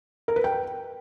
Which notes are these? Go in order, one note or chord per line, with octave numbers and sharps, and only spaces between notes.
A#4
B4
G5